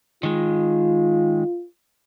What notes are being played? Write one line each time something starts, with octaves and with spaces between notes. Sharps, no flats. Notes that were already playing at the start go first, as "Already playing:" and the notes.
D#3 G#3 F4